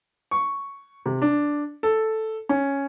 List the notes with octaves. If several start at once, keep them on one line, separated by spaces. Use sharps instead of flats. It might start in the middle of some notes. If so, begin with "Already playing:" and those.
C#6
C3
D4
A4
C#4